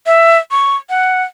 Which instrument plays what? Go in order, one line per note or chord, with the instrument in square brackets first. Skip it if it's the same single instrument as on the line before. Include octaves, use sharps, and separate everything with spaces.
[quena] E5
C#6
F#5